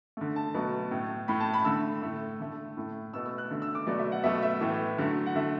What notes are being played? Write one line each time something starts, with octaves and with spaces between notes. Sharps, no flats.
D3 A3
A5
B2 F#3 A3
A2 A3
A2 A3 B5
A5
B5
D3 A3 E6
A2 A3
D3 A3
A2 A3
B2 A3 E6
E6
F#6
D3 A3
E6
D6
B2 F#3 A3 D5
E5
F#5
B2 F#3 A3 E5
E5
A2 E3 A3
D3 F#3 A3
F#5
D3 A3 E5